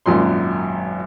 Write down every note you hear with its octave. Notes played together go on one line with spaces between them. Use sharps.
G#1 F#2 A#2 C6